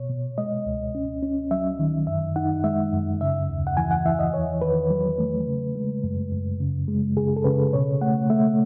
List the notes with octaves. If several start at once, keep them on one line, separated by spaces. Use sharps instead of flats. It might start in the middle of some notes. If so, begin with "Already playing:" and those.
Already playing: B2 C#5
B2
G#3 D#5
C#2
C#4
C#4
F#3 E5
D#3
F#2 E5
D#4 F#5
G#3 E5
F#2
C#3 E5
D#2
F#5
E3 G#5
F#5
E3 E5
D#5
E2 C#5
D#3 B4
F#3
A3
C#3
G#3
F#2
F#2
C#3
G#3
C#3 G#4
A4
C#3 B4
B2 C#5
A3 F#5
A3 E5